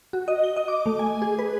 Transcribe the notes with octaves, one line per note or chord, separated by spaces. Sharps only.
F#4
D#5
G7
D#5
D6
A3
G#5
G#4
B4